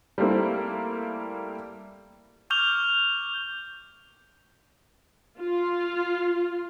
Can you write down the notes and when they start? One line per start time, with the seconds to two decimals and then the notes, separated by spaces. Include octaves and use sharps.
0.18 G3 A3 A#3 C4 E4
2.50 C#6 D6 F6 G6 F7 G7
5.39 F4